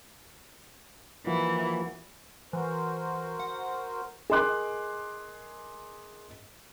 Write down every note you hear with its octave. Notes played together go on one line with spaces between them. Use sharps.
E3 F3 A#3 F#4
E3 F#4 A#4 C5
F#5
G#4 A#4 D#5 C6 D6 F#6